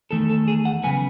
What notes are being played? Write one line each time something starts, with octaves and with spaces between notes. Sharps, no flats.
E2 D#3 A3 A4
A4
G#4
F#5
C#3 F#3 B3 G#5